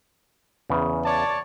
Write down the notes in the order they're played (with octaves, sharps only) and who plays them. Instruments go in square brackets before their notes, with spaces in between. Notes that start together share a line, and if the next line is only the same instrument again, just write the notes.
[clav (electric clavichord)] E2 C#3
[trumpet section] C#5 D5 A5